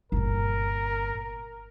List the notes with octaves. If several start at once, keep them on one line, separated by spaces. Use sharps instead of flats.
G1 A#2 A#4